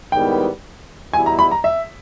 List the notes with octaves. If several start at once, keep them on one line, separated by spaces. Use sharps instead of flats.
G#2 D#3 G3 B3 E4 G5
E2 B2 G3 B3 E4 G#5
A#5
B5
A#5
E5